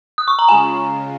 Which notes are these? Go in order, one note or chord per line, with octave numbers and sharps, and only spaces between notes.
D#6
C#6
A#5
C#3 G#3 F4 G#5